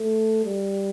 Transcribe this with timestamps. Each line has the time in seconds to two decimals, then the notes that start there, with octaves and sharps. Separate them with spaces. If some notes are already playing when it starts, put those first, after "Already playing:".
Already playing: A3
0.45 G3